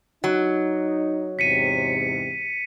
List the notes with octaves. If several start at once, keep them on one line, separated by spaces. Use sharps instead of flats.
F#3 D#4
E2 G#2 C3 B6 C#7 D#7